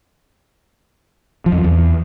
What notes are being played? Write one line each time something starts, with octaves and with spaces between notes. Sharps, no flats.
F3
F2
F3
E2